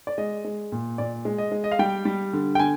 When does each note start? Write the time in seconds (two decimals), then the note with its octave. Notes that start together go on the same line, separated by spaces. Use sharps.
0.07 D5
0.18 G#3 D#5
0.45 G#3
0.72 A#2
0.98 A#2 D5
1.25 G#3
1.38 D#5
1.52 G#3
1.64 D#5
1.71 F5
1.79 G3 G5
2.05 G3
2.33 D3
2.55 G5
2.59 D3 G#5